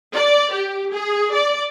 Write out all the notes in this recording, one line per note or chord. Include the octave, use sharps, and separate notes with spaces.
D5
G4
G#4
D5